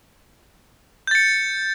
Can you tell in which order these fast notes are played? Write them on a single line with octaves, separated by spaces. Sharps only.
G6 A6 C#7